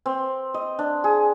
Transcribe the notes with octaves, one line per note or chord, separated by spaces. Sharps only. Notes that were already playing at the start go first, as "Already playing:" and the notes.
C4
D#5
D4
G#4